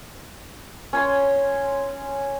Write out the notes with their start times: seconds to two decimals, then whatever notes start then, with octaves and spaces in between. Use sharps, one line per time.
0.93 C#4 C#5 C6